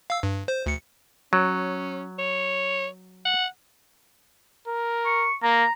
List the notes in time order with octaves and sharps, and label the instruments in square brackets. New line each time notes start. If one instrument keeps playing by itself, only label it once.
[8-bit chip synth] F5 E6
G2
C5
D2 C#7
[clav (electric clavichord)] F#3 [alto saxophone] C#4
[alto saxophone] C#5
F#5
[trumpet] A#4
[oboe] C#6
[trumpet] A#3 [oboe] A#5